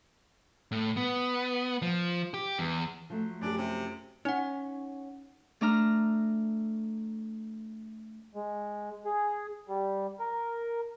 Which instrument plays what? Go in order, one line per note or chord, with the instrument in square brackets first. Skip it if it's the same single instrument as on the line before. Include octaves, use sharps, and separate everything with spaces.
[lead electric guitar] A2
B3
F3
G4
E2
[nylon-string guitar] F3 F#3 A3
[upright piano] F#2 G4 [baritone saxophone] D4
[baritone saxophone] C3
[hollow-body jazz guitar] C#4 [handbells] D#4 F#5
[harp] A3 D4 A#5 F6
[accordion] G#3
G#4
G3
A#4